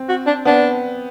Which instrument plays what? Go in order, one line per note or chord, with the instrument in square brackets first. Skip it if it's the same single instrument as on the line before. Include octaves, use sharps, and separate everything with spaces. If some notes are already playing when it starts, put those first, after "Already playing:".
Already playing: [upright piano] C4
[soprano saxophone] F#4
D4
[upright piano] B3 [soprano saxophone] D4